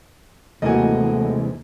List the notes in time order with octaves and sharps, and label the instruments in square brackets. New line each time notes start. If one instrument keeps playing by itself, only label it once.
[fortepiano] D#2 G#5 [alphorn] A2 [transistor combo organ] C3 E3 G#3 [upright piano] F#4 D#5